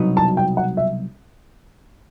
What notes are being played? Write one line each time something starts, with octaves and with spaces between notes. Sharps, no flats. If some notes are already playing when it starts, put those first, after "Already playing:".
Already playing: C2 B2 F#3 B3 D#4
A5
G5
F#5
E5